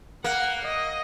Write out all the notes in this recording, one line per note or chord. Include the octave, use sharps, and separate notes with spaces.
A#3 F#5
D#5